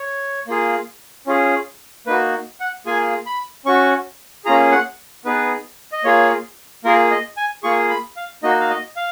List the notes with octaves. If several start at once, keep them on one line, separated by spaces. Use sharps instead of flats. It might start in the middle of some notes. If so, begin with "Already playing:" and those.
Already playing: C#5
A#3 F4 G#4
C#4 F4 G#4
A#3 D#4 F#4 B4
F#5
A#3 F4 G#4 G#5
B5
C#4 F#4 C#6
A#3 C#4 F4 G#4 A#5
F#5
B3 D#4 G#4 B4
D#5
A#3 F4 G#4 C#5
A#3 F4 G#4 A#4
D#5
G#5
A#3 F4 G#4 C#6
B5
F5
A#3 D#4 F#4 D#5
F5
D#5
F5